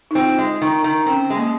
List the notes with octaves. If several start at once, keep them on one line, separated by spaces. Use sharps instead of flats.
D#4
C4 F4
G#3
D#3
D#3
C4 C#4
G#3
A#3